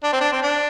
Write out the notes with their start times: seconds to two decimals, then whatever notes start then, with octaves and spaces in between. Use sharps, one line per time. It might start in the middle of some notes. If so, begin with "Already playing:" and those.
0.04 D4
0.13 C4
0.20 D4
0.32 C4
0.43 D4